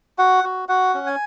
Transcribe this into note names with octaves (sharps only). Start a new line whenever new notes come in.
F#4 F#5
F#4
F#4 F#5
C#4
G#5